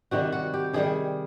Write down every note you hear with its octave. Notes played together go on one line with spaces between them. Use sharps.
C3 D#3 G3 F#4
F#4
G4
C3 D#3 G3 G#4